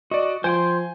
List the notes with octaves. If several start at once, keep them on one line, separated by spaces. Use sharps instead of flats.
F#4 D5 D#5
F3 C5 G5 G#5 C6